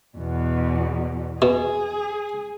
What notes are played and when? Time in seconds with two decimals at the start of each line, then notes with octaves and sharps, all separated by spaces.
0.18 E2 B2
1.42 B2 G#4